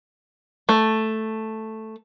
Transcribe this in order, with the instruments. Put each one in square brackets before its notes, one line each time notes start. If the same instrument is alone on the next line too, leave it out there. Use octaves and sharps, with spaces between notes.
[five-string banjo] A3